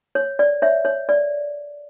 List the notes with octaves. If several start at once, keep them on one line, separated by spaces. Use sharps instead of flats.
C#5
D5
C#5 E5
C#5
D5